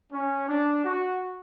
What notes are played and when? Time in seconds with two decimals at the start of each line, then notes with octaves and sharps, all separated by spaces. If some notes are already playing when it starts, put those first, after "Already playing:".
0.12 C#4
0.49 D4
0.84 F#4